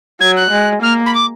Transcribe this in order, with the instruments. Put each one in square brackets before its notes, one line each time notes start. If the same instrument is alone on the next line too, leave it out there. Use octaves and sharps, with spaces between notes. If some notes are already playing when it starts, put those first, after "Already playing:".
[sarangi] F#3 [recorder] G#6
[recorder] F#6
[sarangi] G#3
[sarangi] A#3 [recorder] F6
[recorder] B5
D6